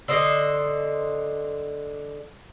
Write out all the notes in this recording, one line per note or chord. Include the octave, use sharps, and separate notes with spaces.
D3 C5 D#5